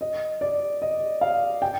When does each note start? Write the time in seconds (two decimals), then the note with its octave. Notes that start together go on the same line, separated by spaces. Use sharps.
0.01 D#5
0.41 D5
0.82 D#5
1.21 F5
1.62 G5